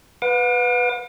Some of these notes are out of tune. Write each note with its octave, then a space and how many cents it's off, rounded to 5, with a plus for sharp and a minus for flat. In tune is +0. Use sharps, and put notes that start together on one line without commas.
B4 +0 F#5 -45 D6 +35